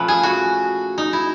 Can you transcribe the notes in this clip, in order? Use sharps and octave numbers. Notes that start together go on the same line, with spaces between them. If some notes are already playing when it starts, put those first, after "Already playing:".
Already playing: A#2 F3 A3 C#4 B4
G#4
F#4
D#4
E4